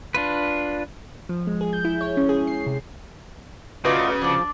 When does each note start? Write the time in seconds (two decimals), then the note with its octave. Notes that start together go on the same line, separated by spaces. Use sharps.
0.15 D4 F4 B4
1.29 F3
1.47 G#3
1.61 G#4
1.73 G6
1.85 E4
2.01 C#5
2.17 C#4
2.29 G#4
2.47 C7
2.67 C3
3.85 C#3 A3 F4 F#4 A#4 B4 D5 D#5
4.22 F3 D4 D5